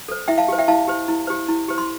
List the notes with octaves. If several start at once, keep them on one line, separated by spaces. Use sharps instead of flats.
A4 C5
E4 E5 G5
F5 A5
G4 C5
E5 G5
E4 F5 A5
G4 C5
E4
G4 C5
E4
G4 C5
C6